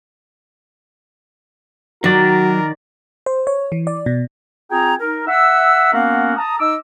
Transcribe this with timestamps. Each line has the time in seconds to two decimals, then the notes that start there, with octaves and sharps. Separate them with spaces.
2.04 D#3 F#3 F#4 A#4 D5
3.26 C5
3.47 C#5
3.72 E3
3.87 D5
4.06 B2
4.71 C4 F4 G#4 G5 G#5 A#5
5.00 D#4 A#4
5.27 E5 F#5 E6
5.93 A#3 B3 C#4 F#4 A#4 F5
6.37 A5 A#5 D#6
6.59 D#4 D#5 D6 E6